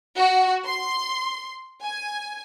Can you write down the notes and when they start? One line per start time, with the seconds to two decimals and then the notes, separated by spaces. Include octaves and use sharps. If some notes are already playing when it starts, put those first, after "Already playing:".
0.17 F#4
0.65 C6
1.84 G#5